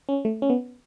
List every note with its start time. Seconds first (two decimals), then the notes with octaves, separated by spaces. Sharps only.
0.09 C#4
0.25 A3
0.42 C#4
0.50 B3